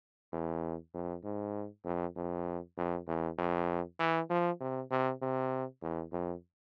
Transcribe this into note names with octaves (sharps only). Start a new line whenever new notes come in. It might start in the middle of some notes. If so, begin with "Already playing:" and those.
E2
F2
G#2
F2
F2
F2
E2
F2
E3
F3
C3
C3
C3
E2
F2